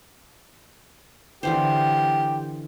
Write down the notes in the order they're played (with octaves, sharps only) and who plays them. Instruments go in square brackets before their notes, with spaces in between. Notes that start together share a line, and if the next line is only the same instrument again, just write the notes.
[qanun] D3 E3 C5 [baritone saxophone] G4